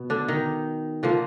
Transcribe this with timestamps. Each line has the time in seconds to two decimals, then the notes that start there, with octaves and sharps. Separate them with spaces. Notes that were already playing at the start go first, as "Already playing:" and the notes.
Already playing: B2 B3
0.10 D3 D4
0.28 D#3 D#4
1.03 D3 F3 A#3